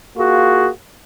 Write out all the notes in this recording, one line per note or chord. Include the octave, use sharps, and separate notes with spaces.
A#3 F4 F#4 G#4